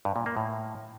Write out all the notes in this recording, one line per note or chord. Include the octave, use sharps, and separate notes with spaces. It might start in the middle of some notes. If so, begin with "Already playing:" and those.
G2
A#2
A#3
A2